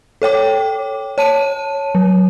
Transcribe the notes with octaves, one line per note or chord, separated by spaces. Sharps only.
A4 C#5 G5 D6
C#5 A5 D#7
F#3